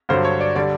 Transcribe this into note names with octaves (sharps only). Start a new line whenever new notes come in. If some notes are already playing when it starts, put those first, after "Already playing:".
G2 D3 F#3 C5
C#5
D5
D3 G3 D5